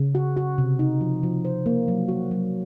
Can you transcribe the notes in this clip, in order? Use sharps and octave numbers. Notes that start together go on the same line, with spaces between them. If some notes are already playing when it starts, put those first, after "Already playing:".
Already playing: C#3
F#4
F#4
C3
D#4
F3
F3
C5
A#3
F#3
F#4
F#3